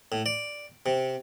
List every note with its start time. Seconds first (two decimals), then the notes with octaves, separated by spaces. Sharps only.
0.12 A2
0.26 D5
0.86 C3